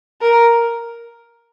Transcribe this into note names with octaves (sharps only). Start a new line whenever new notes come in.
A#4